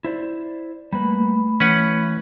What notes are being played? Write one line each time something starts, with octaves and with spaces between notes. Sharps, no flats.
E4 C5 D5
G3 A3 A#3 B4 B5
E3 C#4 B4 F#5